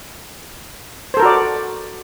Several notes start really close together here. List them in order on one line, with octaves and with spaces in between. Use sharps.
C5 A4 A#4 F#4 D5